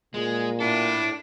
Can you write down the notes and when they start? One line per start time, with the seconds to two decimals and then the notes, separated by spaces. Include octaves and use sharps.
0.14 A#2 G#3
0.60 D4 E4 A4